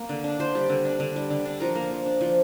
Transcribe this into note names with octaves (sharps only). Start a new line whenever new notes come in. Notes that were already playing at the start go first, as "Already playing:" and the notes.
Already playing: A#3
D3
D4
D3 C5
G3
D3
D4
D3
G3
D3
D4
F3 A#4
A#3
F3
D4
F3